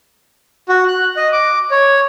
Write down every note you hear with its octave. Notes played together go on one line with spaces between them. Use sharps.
F#4
F#6
D#5
D6
C#5